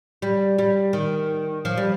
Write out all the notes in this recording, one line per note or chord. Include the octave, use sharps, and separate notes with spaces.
G3
G3
D#3
F3
G3